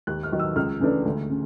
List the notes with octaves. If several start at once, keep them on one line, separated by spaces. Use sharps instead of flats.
D#2 F#6
F6
D#3 F#3
E6
C#2 F6
C#3 E3 A3 D4
D2
C#3